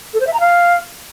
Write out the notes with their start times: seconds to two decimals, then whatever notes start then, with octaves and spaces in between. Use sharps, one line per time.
0.14 A4
0.20 C5
0.27 E5
0.33 A#5
0.40 F5